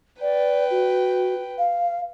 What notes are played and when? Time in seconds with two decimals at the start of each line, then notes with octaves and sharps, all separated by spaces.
0.21 B4 D5 G5
0.70 F#4
1.58 F5